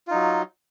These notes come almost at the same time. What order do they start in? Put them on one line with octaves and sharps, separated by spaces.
F4 D#4 F#3